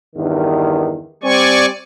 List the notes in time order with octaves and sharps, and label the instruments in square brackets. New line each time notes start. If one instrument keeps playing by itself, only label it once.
[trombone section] E2 G2 D#3
[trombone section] G3 C4 [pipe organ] D5 G#5 C#6